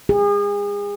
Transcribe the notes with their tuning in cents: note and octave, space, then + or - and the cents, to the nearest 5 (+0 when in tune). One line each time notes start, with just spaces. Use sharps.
G#4 -35